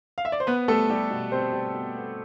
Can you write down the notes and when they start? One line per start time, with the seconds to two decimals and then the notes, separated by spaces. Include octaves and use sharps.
0.18 F5
0.25 E5
0.32 D5
0.40 C5
0.47 B3 B4
0.68 G3 A3 A4
0.90 G3 B3 G4
1.10 B2
1.32 G3 C4 C5
1.53 G3
1.74 B2
1.96 B3